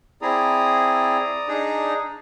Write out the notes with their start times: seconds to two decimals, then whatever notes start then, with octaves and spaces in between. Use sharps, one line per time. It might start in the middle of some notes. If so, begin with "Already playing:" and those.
0.22 C4 E4 G#4 D5 A#5 D#6
1.48 D4 D#4 G#4